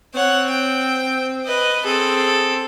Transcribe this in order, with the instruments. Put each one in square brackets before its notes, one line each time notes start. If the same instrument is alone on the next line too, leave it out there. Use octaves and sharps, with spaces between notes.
[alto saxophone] C4 [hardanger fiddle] C#5 F#5
[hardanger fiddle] G5
B4 D#5
[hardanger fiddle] C4 A4 [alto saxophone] G#4